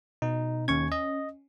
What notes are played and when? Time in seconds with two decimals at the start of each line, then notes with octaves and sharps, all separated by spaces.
0.22 B2 D#4
0.68 D#2 C#4 C#6 G#6
0.92 D#5